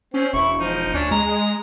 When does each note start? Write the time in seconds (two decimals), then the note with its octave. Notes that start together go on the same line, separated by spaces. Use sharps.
0.14 C4 C#4
0.33 E1 E4 C#6
0.58 E1 F3 D#4
0.94 D2 C#4 D4
1.11 G#3 A#5